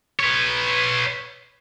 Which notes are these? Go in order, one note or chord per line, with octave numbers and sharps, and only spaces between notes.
B4 C#5